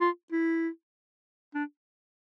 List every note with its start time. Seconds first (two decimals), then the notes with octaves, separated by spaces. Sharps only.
0.01 F4
0.32 E4
1.54 D4